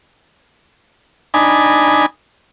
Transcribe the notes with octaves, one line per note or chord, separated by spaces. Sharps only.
D4 D#4 G#5 B5